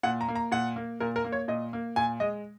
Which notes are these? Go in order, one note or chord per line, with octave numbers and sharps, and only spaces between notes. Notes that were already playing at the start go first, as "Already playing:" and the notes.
A#2 F#5
A#5
A#3
A#5
A#2 F#5
A#3
A#2 A#4
A#4
A#3
C#5
A#2 D#5
A#3
A#2 G#5
G#3 D#5